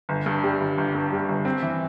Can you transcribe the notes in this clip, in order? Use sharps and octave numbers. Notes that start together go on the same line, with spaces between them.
G1
G2
G3
G1
G1
G2
G3
G1
C4
E3